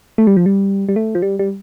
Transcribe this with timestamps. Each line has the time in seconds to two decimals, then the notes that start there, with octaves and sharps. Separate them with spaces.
0.18 A3
0.27 G3
0.37 F3
0.46 G3
0.89 G3
0.96 A3
1.15 F3
1.22 G3
1.39 G3